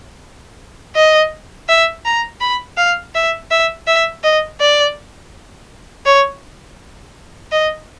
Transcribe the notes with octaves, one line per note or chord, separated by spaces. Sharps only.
D#5
E5
A#5
B5
F5
E5
E5
E5
D#5
D5
C#5
D#5